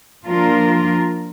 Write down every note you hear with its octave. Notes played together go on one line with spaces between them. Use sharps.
F3 A#3 D4 F4 A#4